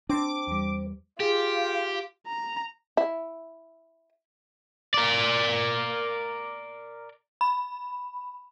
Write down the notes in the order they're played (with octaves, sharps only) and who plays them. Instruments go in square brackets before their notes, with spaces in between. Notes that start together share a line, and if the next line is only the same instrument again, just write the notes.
[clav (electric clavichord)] C4 C5 A5 [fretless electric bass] D4 [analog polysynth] D6
[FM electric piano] E2 G3
[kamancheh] F4 [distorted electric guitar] G4 [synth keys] G#4
[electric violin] A#5
[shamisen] E4
[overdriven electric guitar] A#4 D5
[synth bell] B5